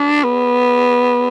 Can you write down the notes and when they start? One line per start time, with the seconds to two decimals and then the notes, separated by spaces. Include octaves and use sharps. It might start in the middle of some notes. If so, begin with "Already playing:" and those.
Already playing: D4
0.24 B3